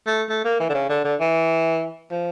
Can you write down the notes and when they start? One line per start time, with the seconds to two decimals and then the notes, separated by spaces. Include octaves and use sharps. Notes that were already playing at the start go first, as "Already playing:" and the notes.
0.06 A3
0.29 A3
0.45 A#3
0.60 E3
0.70 D3
0.74 C#3
0.89 D3
1.04 D3
1.20 E3
2.11 F3